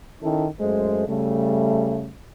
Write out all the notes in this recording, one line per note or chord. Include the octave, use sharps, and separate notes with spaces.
D#3 C#4 E4 A4
F#2 G#3 A3 C5
C#3 G3 A3